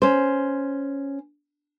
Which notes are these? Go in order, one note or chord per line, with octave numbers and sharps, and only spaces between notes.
C#4 C5